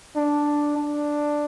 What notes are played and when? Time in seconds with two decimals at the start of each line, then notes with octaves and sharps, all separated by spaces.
0.16 D4
0.77 D4